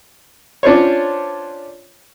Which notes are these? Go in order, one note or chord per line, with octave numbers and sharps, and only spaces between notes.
C#4 D4 F4 C5 C#5